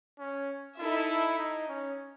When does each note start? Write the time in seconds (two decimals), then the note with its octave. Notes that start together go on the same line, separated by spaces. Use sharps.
0.19 C#4
0.78 D#4 E4 A4 E5
1.39 D#4
1.68 C#4